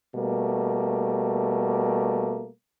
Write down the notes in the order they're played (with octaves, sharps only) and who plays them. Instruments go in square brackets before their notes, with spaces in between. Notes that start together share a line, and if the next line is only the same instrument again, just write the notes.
[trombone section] B2 G3 A3 A#3